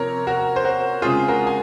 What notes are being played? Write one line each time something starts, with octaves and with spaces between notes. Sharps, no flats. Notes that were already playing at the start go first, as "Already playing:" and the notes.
Already playing: C3 F3 C4 A#4 C#5 A#5
F#4 A#4
C5
F#4 A#4
C#3 G#3 C4 F4 G#4
F#4 A#4
G#5